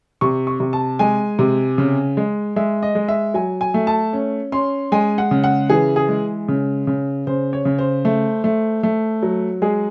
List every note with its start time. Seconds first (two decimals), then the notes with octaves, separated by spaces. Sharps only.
0.21 C3 C#6
0.47 C#6
0.60 C3
0.73 A5
0.99 G#3 G#5
1.39 C3
1.78 C#3
2.17 G#3
2.56 G#3 E5
2.83 D#5
2.95 G#3
3.08 E5
3.34 F#3 G#5
3.61 G#5
3.74 A3
3.87 A5
4.13 C#4
4.52 C#4 C6
4.92 G#3 G#5
5.18 F#5
5.31 C#3
5.44 F#5
5.70 E3 G#4
5.96 G#4
6.09 G#3
6.48 C#3
6.87 C#3
7.27 C#3 C5
7.53 C#5
7.65 C#3
7.79 C5
8.05 A3
8.44 A3
8.83 A3
9.23 F#3
9.62 G#3 G#4